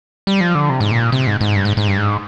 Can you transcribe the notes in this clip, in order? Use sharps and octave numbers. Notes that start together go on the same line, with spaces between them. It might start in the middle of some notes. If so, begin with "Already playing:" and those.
G3
F3
D3
C3
G#2
A#2
C3
G#2
G#2
G2
G#2
G#2
G2
G#2